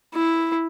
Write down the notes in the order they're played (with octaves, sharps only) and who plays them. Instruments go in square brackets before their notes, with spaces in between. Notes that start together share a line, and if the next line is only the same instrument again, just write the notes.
[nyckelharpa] E4